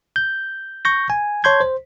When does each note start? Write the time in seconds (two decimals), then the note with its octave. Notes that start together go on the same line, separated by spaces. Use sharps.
0.16 G6
0.85 C#6 G6 A#6
1.10 G#5
1.44 C#5 A5 C6 G6 G#6
1.60 C5